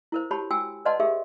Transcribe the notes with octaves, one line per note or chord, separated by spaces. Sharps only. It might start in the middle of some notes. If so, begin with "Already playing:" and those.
E4 A#4 C5
F#4 G4 C#5 A5 B5
F#4 G5 G#5 E6
B4 D5 D#5 F#5 A5 C6
G4 G#4 A#4 E5